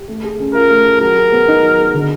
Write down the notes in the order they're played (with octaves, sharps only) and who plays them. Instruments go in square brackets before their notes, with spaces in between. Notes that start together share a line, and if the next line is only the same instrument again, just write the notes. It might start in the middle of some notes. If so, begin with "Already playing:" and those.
Already playing: [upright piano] G4
A3
G#4
C#4
[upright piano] F4 [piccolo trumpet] A#4
[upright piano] A3
G#4
[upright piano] F#3 [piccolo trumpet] A#4
[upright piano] G#4
B3
D#4
F#3
G#4
D3